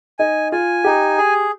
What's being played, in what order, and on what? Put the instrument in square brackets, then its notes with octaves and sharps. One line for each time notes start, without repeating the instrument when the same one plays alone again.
[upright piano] D#4 [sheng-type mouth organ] G#5
[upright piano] F4 [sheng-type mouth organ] G#5
[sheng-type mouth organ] D#4 [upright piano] G4
[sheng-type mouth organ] G#4